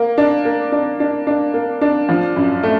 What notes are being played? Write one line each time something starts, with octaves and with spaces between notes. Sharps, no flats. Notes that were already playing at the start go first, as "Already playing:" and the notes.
Already playing: A#3
D4
A#3
D4
D4
D4
A#3
D4
F3
F#2
A3